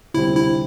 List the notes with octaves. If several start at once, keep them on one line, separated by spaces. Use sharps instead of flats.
D2 C3 G3 C4 E4
E4